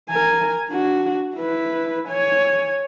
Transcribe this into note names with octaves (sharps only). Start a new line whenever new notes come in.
A#4 G#5
D4 F#4
E4 B4
C#5 G#5